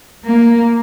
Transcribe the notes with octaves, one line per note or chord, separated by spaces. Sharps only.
A#3